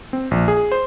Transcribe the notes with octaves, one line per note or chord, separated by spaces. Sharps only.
C4
A#1
G#4
C5